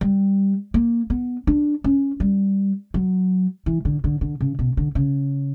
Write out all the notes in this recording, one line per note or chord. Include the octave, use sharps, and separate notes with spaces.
G3
A#3
B3
D4
C#4
G3
F#3
E3
D3
D3
D3
C#3
B2
D3
C#3